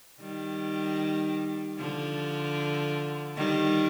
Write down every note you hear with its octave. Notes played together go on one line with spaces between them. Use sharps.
D#3 G3
D3 F3
D#3 G3